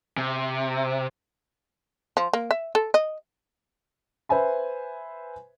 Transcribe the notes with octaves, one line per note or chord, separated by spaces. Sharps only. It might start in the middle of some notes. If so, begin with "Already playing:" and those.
C3
F3
A#3
E5
A4
D#5
B4 C5 E5 G#5 B5